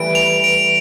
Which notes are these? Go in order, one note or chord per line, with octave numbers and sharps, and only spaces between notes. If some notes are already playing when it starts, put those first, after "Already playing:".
Already playing: E3 G3 A3 D7
F7
D7